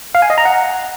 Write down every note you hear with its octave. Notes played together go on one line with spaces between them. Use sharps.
F5
G#5
D#5
A#5
F#5